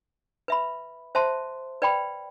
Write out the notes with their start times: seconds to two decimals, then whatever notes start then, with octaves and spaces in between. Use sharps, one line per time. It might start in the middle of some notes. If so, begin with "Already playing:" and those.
0.48 B4 E5 B5
1.15 C5 E5 A5 C6
1.82 B4 D5 G5 B5